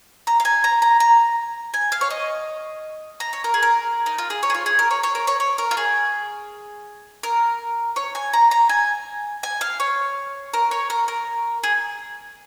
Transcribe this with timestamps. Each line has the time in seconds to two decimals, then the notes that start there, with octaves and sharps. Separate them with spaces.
0.27 A#5
0.40 F5
0.45 G#5
0.64 A#5
0.82 A#5
1.00 A#5
1.74 G#5
1.92 F5
2.01 C#5
2.10 D#5
3.20 A#5
3.33 C#5
3.44 A#4
3.54 G#4
3.63 A#4
4.06 D#4
4.18 F4
4.30 G#4
4.43 C#5
4.50 G#4
4.54 F4
4.66 G#4
4.79 A#4
4.91 C#5
5.03 C#5
5.15 A#4
5.27 C#5
5.40 C#5
5.58 A#4
5.71 F4
5.77 G#4
7.23 A#4
7.96 C#5
8.15 G#5
8.33 A#5
8.51 A#5
8.69 G#5
9.43 G#5
9.61 F5
9.80 C#5
10.54 A#4
10.71 C#5
10.90 A#4
11.08 A#4
11.63 G#4